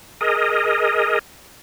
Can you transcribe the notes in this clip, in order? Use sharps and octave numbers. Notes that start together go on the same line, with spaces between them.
G#4 A#4 D#5